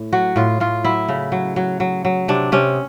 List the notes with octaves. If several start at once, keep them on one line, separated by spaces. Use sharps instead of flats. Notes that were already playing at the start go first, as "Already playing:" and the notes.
Already playing: A2
F#3 F#4
A2 F4
A2 F4
F#3 E4
C#3
F#3
F#3
F#3
F#3
C3 D4
C3 C#4